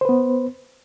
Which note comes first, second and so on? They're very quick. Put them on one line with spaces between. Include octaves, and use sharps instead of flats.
C5 B4 B3